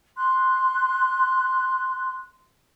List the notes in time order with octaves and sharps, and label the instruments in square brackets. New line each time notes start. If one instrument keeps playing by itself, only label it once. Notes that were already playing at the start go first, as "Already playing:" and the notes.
[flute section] C6 F#6